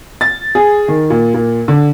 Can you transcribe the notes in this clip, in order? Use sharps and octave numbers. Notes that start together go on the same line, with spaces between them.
A6
G#4
D#3
A#2
A#2
D3